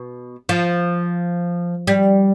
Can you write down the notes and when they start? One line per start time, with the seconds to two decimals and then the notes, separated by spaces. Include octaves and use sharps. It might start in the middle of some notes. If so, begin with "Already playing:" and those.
Already playing: B2
0.49 F3
1.87 G3